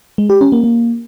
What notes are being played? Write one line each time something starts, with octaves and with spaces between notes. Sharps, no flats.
G#3
G4
C#4
A#3
A#3